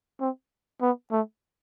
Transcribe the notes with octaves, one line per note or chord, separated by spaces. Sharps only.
C4
B3
A3